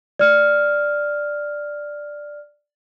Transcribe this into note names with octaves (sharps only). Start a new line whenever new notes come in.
D5 F6